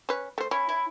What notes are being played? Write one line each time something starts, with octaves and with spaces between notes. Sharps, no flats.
C#4 B4
A3 C5
C#4 E4
E4